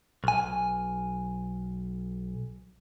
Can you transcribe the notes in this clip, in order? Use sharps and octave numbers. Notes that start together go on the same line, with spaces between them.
B1 G#5